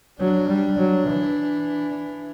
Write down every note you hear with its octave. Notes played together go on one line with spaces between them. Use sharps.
F#3 D4
G3
F#3
E3
D4